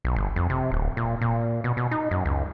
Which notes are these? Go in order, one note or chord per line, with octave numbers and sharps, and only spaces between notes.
B1
G1
F2
C3
D1
A#2
A#2
B2
B2
D#4
F#2
C#2